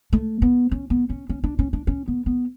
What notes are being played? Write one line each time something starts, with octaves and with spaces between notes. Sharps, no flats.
A3
B3
C#4
B3
C#4
C#4
D4
C#4
D4
C#4
B3
B3